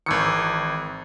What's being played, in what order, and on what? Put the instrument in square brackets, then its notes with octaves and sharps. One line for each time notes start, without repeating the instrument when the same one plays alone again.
[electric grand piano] G#1 C#7 [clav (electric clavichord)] D#3 E3